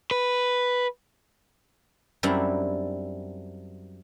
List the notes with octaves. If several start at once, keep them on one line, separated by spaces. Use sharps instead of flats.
B4
F#2 G3 C4 D4 E4 A#5